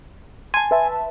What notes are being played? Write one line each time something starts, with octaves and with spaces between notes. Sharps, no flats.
G#5 A5 C6
B4 E5 A5